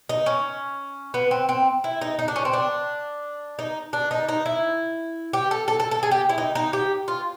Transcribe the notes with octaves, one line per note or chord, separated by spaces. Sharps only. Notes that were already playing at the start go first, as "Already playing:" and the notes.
D#4
C#4
B3
C4
C4
E4
D#4
D#4
D4
C#4
C4
D4
D#4
D4
D#4
D#4
E4
G4
A4
A4
A4
A4
G#4
G4
E4
D#4
D#4
G4
F4